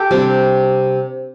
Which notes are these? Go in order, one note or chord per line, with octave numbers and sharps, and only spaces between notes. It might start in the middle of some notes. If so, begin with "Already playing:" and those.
Already playing: G4 A4
C3 G3 D4